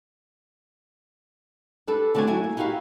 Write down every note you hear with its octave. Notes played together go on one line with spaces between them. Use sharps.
G3 D4 A4 B4
D3 A3 D4 F#4 C#5 G#5
F#3 E4 F#4 G#5
A#3
D#4 E4 F#4 G4 F5